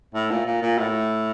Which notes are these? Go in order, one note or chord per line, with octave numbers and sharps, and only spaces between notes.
A2
A#2
A#2
A#2
A2